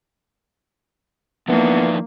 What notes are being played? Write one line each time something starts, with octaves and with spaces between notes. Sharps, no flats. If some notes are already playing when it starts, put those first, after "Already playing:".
E3 F3 A#3 B3 D4 D#4